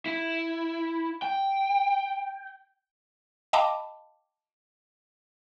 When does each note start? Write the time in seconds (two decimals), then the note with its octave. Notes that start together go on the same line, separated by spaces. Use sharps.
0.06 E4
1.22 G5
3.53 D#5 F5 G5 A5 B5 D6